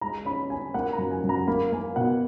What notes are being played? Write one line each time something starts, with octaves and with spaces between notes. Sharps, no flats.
G#3 A#5
C#4 B5
C#4 G#5
A#3 F#5
A#5
F#2
G#5
F#2
A#5
A#3 B5
A#3 G#5
B2 F#5